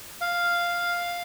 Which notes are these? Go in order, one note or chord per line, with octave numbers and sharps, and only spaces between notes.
F5